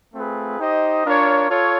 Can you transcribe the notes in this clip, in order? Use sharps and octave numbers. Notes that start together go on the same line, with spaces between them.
A3 C4 F4 G#4 B4
D#4 G4 C5 D#5
D4 F4 A#4 C#5
F4 A4 C#5